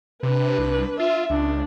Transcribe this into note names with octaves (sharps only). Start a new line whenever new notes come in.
C3 D4 B4
C2
F4 E5
C#2 D4